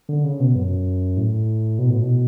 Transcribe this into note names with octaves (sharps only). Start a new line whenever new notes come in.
D3
C#3
B2
F#2
A2
B2
A2
B2